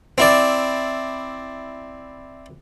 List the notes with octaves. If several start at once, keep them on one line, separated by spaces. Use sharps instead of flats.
C4 E4 D5